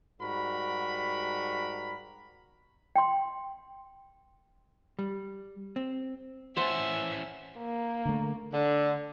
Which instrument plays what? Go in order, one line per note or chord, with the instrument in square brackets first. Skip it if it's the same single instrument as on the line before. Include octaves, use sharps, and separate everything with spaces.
[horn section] G#2 G3 F#4 A#4 B5
[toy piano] G5 C6
[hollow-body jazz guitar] G3
C4
[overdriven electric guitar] E3 C#4 [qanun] C5 F#5 [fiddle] E5 [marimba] C6 A6
[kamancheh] A#3
[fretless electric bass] D3 A3
[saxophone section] D3